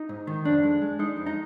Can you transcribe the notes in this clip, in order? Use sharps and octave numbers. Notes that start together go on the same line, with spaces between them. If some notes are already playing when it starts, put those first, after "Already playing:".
Already playing: D#4
G#2
D#3
F2 D4
G#3
G#3
G#3 D#4
F2
D#4